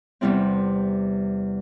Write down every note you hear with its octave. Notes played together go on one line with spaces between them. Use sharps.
E2 C3 G3 C4 E4